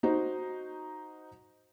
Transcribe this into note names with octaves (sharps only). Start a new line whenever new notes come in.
D#4 F#4 C5